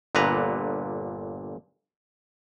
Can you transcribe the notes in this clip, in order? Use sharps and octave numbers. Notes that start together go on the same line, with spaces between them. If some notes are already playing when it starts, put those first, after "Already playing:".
G1 A#2 D3 B4 A#5